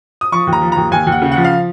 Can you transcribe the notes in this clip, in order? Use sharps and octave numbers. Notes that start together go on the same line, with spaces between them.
D#6
F3 C#6
D#2
A#5
F3
D#2 A#5
D#2 G#5
D#2
F#5
C#3
F#5
F3
F5